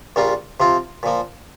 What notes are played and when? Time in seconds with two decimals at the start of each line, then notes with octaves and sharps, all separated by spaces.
0.16 A#1 A#2 G3 A#3 F4
0.60 C3 F3 C4 F4
1.03 A#2 F3 A#3